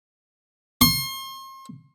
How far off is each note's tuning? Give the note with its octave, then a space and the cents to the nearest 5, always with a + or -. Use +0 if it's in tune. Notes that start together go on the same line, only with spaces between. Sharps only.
C6 +35